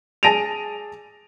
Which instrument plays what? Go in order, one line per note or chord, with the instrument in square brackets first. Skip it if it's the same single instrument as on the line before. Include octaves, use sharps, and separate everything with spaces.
[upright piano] G#4 A5 A#6 D7 D#7 F7